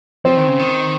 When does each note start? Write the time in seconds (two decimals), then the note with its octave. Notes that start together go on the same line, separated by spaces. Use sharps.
0.25 F3 C4
0.37 D#3
0.48 C#3
0.59 D#3